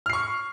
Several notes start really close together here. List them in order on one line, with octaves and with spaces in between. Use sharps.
F6 C7 C#6